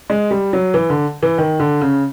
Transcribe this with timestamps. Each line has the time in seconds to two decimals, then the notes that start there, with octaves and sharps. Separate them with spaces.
0.10 G#3
0.31 G3
0.53 F#3
0.74 E3
0.90 D3
1.23 E3
1.38 D#3
1.60 D3
1.82 C#3